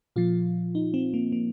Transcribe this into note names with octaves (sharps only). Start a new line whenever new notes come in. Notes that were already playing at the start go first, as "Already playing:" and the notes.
A#2 F3 F4
D#4
C4
A#3
A#3